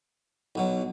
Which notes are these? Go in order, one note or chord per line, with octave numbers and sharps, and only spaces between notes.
B1 B2 F#3